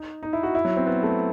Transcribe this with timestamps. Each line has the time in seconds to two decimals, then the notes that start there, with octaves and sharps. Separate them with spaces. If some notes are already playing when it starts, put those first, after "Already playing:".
Already playing: D#4
0.23 D#4
0.33 E4
0.43 F#4
0.55 E4
0.65 F#3
0.77 C4
0.87 B3
1.03 A3